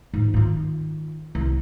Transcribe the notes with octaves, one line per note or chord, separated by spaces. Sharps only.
G#2
D#3 F4
C2